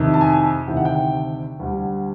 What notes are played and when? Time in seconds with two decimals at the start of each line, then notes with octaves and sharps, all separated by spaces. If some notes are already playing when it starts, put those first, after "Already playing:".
Already playing: F2 C3 D#3
0.14 A5
0.21 G#5
0.67 D2 C3 D#3 G5
0.77 F#5
0.85 G5
1.59 D2 D3 G3